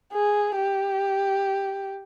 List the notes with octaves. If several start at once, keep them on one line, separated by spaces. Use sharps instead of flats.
G#4
G4